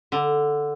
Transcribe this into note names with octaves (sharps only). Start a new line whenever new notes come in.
D3